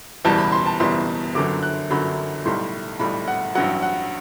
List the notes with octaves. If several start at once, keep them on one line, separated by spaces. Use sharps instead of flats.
F#1 E2 B2 G3 A5
B5
C6
A5
F#1 E2 B2 G3 C6
G1 F#2 D3 F#3 D6
F#6
G1 F#2 D3 F#3 B5
B1 A2 G3 C6
B1 A2 G3 B5
F#5
A1 G2 F#3 F#5
F#5